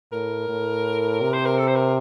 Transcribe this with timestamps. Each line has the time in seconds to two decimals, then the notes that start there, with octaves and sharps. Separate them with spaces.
0.12 A2 A#4
0.49 A2
1.22 C3
1.33 C5
1.45 A#4
1.58 A4
1.67 C5
1.75 A#4